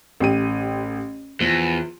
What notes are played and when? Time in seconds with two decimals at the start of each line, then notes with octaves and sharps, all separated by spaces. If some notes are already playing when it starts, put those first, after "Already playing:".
0.20 A1 G4 D#7
1.40 E2 F3